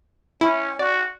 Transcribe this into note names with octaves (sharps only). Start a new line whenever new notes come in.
C#4 E4
F#4 D5